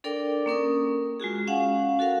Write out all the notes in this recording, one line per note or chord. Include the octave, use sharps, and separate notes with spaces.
D4 A4 A#4 D5 G5 D6
A#3 C#4 A#4 D#6
G#3 F4 F#4 G#4
C#4 F5 F#5 G#5
F#4 A4 A#4 F5